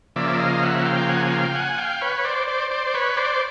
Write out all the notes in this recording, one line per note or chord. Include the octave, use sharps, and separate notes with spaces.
C#3 F3 A#3 D5 E5
D#5 F5
E5 F#5
F5 G5
F#5 G#5
F#5
F5 G5
F#5 G#5
F5 G5
B4 C#5
C5 D5
C5 D5
C5 D5
D5
B4 C#5
C5 D5